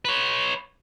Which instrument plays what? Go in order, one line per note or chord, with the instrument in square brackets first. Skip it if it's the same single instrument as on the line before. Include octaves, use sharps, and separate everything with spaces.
[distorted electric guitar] B4 C#5